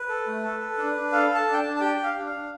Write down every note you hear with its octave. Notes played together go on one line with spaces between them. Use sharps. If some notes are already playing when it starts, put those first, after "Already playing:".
Already playing: B4
A4
A3
A4
A4
D4
D4
A4 F5
A4
A5
D4
G5
A5
D4
A5
G4 G5
G4
F5
D4
F5
D4